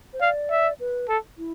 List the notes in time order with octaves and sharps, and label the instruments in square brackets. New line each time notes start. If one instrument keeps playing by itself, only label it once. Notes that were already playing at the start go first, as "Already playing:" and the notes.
[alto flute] C5
[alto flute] D5 [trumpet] F5
[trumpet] E5
[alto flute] B4
[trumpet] A4
[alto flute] E4